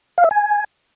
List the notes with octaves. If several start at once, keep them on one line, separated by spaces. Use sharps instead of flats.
F5
E5
G#5